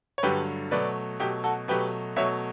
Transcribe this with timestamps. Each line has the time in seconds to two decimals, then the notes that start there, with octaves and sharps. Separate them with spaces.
0.18 C#5
0.23 G2 D3 F#3 A3 G4 B4
0.71 B2 F#3 A3 B4 D5
1.20 B2 F#3 A3 G4
1.44 F#4 A4
1.68 B2 F#3 A3 G4 B4
2.16 B2 F#3 A3 C#5 E5